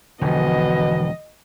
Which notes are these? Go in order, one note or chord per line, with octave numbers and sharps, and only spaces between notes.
E1 B2 D3 E3 F3 D#5